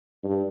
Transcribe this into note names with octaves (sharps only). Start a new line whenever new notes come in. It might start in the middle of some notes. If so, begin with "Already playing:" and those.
G2